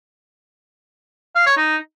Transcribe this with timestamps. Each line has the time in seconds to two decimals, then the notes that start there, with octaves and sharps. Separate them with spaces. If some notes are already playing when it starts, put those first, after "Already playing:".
1.36 F5
1.46 C#5
1.57 D#4